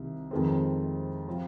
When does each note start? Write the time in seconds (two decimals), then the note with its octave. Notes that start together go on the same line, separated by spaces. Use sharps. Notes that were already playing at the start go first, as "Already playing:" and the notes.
Already playing: C2 C3 D#3
0.31 F2 C3 D#3 G#3 C4
1.28 C3 F3 C4 F4